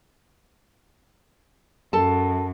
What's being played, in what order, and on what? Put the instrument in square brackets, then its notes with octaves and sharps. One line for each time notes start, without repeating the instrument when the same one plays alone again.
[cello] F#2 [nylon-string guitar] A4 A5